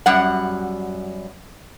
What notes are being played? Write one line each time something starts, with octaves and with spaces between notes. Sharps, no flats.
F#2 G3 F#5